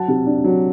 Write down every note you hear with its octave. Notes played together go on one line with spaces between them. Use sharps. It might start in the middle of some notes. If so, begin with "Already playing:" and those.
Already playing: F#3 F#5 A5
C3
D4
F#3